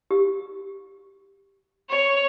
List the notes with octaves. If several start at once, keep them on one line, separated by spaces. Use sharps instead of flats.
G4
C#5